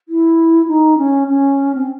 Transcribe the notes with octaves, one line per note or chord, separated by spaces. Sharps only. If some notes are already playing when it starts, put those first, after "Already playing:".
E4
D#4
C#4
C#4
C4